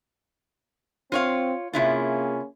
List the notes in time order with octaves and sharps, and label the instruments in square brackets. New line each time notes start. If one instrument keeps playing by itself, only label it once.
[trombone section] C4 [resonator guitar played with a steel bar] F4 C#5 F5
[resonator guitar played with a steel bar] C3 E4 F4 [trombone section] A#3 C#4 G#4